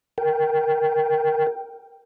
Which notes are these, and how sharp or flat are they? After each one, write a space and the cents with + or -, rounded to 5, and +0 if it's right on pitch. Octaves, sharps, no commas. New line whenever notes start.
A#4 +0 G5 +0